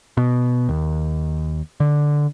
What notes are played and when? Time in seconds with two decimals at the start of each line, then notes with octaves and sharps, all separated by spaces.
0.17 B2
0.69 D#2
1.80 D3